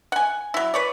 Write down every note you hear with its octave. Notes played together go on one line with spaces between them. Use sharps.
F#5 G#5
F#3 E4
B4 C#5 D5